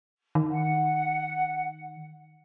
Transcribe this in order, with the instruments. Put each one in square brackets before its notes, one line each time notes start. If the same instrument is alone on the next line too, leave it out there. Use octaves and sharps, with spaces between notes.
[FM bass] D#3
[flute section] F#5